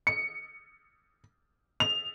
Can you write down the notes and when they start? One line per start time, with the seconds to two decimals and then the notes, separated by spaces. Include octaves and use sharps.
0.07 C#7
1.80 F7